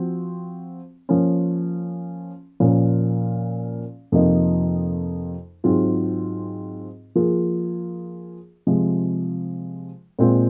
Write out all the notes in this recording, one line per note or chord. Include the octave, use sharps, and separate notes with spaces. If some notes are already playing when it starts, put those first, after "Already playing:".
Already playing: F3 C4 F#4
F3 A#3 C#4
A#2 F3 A#3 C#4
F2 C3 F3 A#3 D#4
G#2 F#3 C4 F4 G#4
F3 A#3 F4 G#4
C3 F3 G#3
A#2 G#3 C4 F4